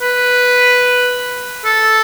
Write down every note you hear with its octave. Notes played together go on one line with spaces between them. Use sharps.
B4
A4